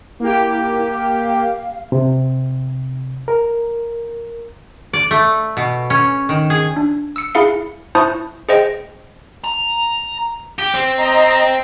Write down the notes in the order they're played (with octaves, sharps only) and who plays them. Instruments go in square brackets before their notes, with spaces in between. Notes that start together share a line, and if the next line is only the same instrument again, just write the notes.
[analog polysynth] A#3 G4 [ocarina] E4
[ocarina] F5
[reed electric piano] C3
A#4
[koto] D5
A3
B2
C#4
D#3
G#4
[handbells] D4
E6 C#7
E4 G#4 F5 C#7
E4 C5 A5 C#6 D#6 G6
G#4 C5 D#5 G5
[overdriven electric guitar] A#5
[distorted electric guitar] G4
C4
[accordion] D#5 A#5